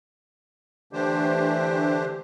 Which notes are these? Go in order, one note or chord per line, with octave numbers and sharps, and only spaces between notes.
D3 E3 A3 D4 G4 C5